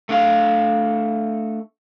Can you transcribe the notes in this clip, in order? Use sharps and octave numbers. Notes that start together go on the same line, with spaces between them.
A3 D4 F5